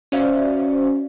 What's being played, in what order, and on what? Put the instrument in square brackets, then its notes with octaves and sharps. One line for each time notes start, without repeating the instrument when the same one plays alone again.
[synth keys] C#4 F#4 C5 D5 E5 F5